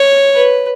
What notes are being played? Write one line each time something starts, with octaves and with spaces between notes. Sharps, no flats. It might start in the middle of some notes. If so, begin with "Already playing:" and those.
Already playing: C#5
B4